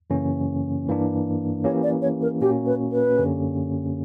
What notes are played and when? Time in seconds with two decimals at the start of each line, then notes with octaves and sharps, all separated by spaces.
0.10 F#2 C#3 E3 A#3 C#4
0.87 G2 E3 A#3 D4
1.64 E3 A#3 C#4 G4 C#5
1.83 D5
2.02 C#5
2.22 A#4
2.41 A#2 A#3 C#4 F#4 G4
2.66 B4
2.92 B4
3.17 F#2 D3 A#3 C#4 G4